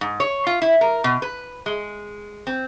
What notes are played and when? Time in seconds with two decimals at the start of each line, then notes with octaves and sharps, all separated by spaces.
0.01 G#2
0.20 C#5
0.47 F4
0.62 E4
0.81 A#4
1.04 B2
1.22 B4
1.66 G#3
2.47 C4